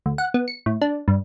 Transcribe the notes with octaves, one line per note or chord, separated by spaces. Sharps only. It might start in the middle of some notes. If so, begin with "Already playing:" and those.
D2
F#5
B3
C#7
A2
D4
G2